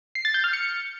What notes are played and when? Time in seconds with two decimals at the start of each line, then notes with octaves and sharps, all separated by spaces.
0.15 C7
0.25 A6
0.34 G6
0.44 F6
0.53 C#7